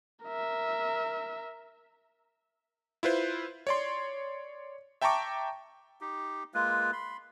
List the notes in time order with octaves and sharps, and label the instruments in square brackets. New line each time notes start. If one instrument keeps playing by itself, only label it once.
[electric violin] A#4 E5
[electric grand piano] E4 F4 B4 C5
C#5 D5 C6
E5 G5 A5 A#5 C#6 D6
[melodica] D#4 G4
G#3 A#3 F4 B4
B5 C6